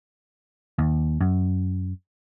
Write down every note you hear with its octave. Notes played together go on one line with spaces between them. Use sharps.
D#2
F#2